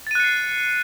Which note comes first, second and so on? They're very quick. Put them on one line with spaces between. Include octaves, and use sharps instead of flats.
A6 D#7 F#6 C#7 C7